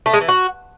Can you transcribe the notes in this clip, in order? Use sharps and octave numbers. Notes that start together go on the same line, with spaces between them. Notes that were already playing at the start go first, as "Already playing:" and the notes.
A3
G#3
E3
F#4